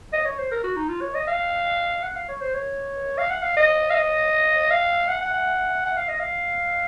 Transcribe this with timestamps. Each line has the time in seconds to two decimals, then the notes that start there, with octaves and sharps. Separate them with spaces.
0.13 D#5
0.25 C#5
0.38 C5
0.51 A#4
0.64 F#4
0.76 D#4
0.89 F4
1.01 C#5
1.15 D#5
1.27 F5
2.03 F#5
2.16 F5
2.29 C#5
2.41 C5
2.54 C#5
3.18 F5
3.30 F#5
3.43 F5
3.57 D#5
3.90 F5
3.94 D#5
4.71 F5
5.09 F#5
5.21 F#5
5.34 F#5
5.85 F#5
5.97 F5
6.08 D#5
6.20 F5